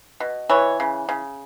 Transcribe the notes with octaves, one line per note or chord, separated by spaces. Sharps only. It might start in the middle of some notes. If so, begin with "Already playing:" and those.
B2
E3 C#5
C#3
C#3